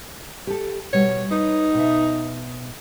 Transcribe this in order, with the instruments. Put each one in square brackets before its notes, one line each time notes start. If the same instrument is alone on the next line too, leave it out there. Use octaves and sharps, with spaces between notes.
[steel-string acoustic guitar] G4 A4
[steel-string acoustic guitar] B2 G3 [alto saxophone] C#5
[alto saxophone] D#4 [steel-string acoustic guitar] B4
[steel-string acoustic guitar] B2 E5